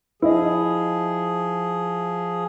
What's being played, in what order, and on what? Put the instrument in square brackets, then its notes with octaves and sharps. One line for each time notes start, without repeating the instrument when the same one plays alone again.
[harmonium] F3 G#4 [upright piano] E4 D#5